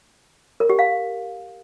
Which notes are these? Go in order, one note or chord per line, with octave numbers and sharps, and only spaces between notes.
A#4
G4
F5